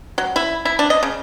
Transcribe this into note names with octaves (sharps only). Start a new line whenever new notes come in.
F#3
E4
E4
D4
D#5
C#3